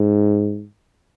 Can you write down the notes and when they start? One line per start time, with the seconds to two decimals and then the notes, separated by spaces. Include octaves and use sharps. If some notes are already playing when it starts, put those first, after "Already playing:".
Already playing: G#2